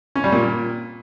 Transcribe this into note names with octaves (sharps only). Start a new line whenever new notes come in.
C#4
G3
A#2